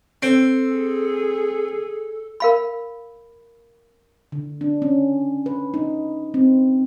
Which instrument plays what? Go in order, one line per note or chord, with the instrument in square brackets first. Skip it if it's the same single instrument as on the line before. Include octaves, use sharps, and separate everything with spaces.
[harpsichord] C4 [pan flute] A4
[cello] G#4
[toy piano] A#4 F5 B5
[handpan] D3
D4
C#4
B4
D#4
C4